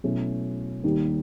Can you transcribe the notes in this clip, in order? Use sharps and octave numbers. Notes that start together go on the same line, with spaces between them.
B2 F#3 A3 C#4 E4
D#2 D#3 G3 A#3 D#4